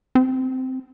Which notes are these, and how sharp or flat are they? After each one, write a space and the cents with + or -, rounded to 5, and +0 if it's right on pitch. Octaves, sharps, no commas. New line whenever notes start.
C4 -10